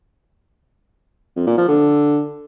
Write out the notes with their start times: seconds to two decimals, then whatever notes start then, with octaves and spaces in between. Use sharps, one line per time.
1.36 F2
1.47 A#2
1.57 F3
1.68 D3